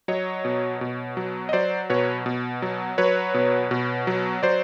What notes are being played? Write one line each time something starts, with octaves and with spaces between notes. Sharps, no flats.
F#3 C#5 D#5
B2
B2
F#3
D#5
F#3 C5 D5
B2 B4 C#5
B2
F#3
F#3 B4 C#5
B2
B2
F#3
F#3 C5 D5